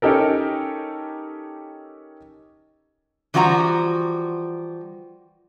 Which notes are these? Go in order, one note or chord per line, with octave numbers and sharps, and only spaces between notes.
C#4 D#4 G4 A4 A#4
E3 F3 G3 F#4 A#5